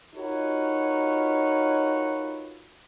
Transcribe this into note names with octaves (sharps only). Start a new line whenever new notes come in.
D#4 F4 F#4 A#4 B4 C#5